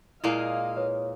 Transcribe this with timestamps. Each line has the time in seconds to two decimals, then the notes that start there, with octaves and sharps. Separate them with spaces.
0.24 A#2 G#3 A#3 E4 D5 D#5 F5
0.77 B4 C#5